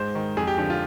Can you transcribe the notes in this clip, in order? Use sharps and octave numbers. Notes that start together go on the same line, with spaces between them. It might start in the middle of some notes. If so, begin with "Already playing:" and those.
Already playing: G#2 C5
D#3
F2 G#4
G4
D3 F3 G4
F4